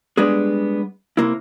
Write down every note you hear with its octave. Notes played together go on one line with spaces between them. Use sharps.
G3 G#3 B3 D4 G#4
C3 A#3 E4